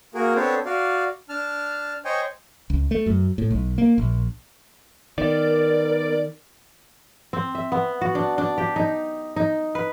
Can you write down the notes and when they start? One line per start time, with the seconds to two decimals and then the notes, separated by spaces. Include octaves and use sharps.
0.15 A#3 F#4 G#4 A#4
0.36 B3 C4 D4 A4 C5 C#5
0.66 F#4 D5 F5
1.29 D4 A5 F6
2.05 C5 C#5 D#5 G5 G#5 C#6
2.70 C#2
2.91 A3
3.06 F#2
3.38 A2
3.50 B1
3.78 A#3
3.98 A#1
5.18 D#3 B3 A#4 D5
7.33 C4
7.55 E5
7.72 B3
8.01 F#4
8.15 D4
8.38 D4
8.58 G4
8.76 D#4
9.36 D#4
9.75 B4